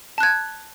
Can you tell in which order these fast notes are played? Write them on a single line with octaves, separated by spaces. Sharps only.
A5 F#6 G#6